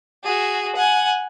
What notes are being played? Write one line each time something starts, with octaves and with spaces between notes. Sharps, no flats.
F#4 G#4
F#5 G#5